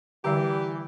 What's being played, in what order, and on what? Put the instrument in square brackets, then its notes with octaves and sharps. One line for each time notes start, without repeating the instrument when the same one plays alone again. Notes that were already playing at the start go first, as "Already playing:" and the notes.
[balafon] D3 G3 D5 [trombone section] E3 [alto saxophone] G4